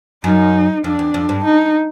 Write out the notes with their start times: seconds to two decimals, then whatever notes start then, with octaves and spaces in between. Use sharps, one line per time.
0.24 F#2 D#4
0.84 F2 D4
0.99 E2
1.14 F2
1.29 G2
1.44 D#4